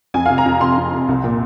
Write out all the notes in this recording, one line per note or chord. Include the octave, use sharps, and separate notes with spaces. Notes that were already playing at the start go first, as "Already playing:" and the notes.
F2 G#5
C3 F5
A#5
F2
C3 C6
F2
C3
C2
A#2